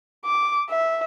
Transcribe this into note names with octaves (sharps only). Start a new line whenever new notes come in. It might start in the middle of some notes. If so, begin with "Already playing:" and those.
D6
E5